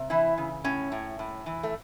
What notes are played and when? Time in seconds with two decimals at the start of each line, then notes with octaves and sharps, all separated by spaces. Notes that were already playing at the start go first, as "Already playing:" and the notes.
Already playing: C3
0.10 E3 E4
0.38 C#3
0.64 A2 C#4
0.92 A2
1.19 A2
1.46 E3
1.63 A3